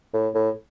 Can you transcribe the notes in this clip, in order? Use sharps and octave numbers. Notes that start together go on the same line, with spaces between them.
A2
A2